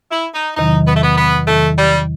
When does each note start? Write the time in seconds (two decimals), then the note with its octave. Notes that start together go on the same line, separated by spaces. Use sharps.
0.11 E4
0.34 D#4
0.56 E2 C3 D#3 F#3 D#4
0.87 B3
0.95 A3
1.03 B3
1.18 B3
1.47 E2 C3 D#3 F#3 A3
1.78 G3